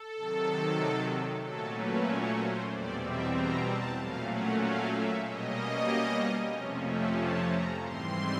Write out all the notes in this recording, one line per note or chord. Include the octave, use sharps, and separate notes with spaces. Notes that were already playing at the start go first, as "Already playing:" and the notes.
Already playing: A4
C3 D#3 F#3
A#2 F#3 A3 C#4 A4
B4
C#5
C5
E2 B2 G3 C4 D5
E5
A#5
A5
A#2 F#3 A3 C#4 F5
F#5
F5
E5
B2 G3 A#3 C#4 D#5
F2 C3 F3 A3 C#4
E5
A5
A#5
G#2 E3 G3 C4 C6